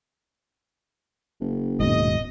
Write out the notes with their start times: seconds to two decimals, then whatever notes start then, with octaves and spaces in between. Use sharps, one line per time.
1.41 F#1
1.80 D#1 G#2 B2 D#5